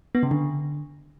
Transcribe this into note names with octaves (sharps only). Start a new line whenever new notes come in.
B3
C#3
D3